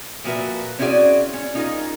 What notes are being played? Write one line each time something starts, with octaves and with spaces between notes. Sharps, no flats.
A#2 F3 F#4 A#4 B4 E5
C4 C#4 E4 F#4 G#4 D5
C#4
C#4 D#4 F4 G#4 A#4